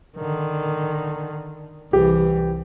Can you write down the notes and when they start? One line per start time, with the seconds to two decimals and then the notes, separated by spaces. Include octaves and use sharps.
0.17 D3 D#3
1.93 C2 E3 G4